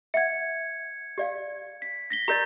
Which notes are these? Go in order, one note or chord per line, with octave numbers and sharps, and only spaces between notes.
E5 F#5 G#6 C#7
G4 D5 F5
B6
A#6 B6 G7
G4 A#4 D5 A#5 G6 A6